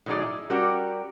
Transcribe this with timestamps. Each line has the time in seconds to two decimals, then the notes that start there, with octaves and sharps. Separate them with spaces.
0.06 A2 D#3 F#3 D#4 G#4 D5
0.22 E4
0.50 G3 C#4 F#4 G4 A#4 D5